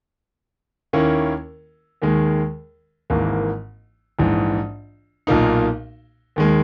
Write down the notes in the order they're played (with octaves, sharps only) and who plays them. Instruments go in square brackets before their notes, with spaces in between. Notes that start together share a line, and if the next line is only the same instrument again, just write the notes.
[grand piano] D#2 D#3 A#3 C#4 E4
D#2 D#3 G#3
G#1 G#2 E3 A#3 E4
A#1 G#2 E3
B1 A#2 A#3 D#4
D#2 D#3 G#3